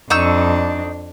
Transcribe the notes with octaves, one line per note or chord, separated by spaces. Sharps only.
F2 D4 D#4 C#6 E6